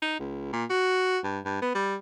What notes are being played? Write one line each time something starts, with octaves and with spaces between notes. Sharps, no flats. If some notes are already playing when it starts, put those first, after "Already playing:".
D#4
C#2
A#2
F#4
G2
G2
B3
G3